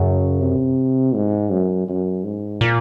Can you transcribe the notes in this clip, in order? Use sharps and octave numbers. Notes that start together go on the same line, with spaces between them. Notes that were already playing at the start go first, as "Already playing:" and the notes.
Already playing: F#2 C#3
C3
G#2
F#2
F#2
G#2
A#2